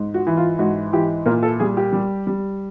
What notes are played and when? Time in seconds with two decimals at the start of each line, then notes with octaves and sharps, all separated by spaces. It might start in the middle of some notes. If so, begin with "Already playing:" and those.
Already playing: G#2
0.14 F#4
0.27 E3
0.37 F4
0.59 G#2 F#4
0.93 E3 G4
1.26 A#2 A#4
1.43 A4
1.60 G3 G#4
1.77 G4
1.93 G3
2.27 G3